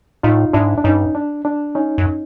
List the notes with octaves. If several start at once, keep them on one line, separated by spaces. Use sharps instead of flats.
A2 D#4 F4
G#2 D4 E4
D4
G2 C#4 D#4
D4
D4
C#4 D#4
F#2